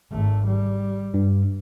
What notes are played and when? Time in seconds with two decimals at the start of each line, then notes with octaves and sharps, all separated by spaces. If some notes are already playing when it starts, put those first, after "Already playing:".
0.11 G#1 A3
0.47 G3
1.14 G2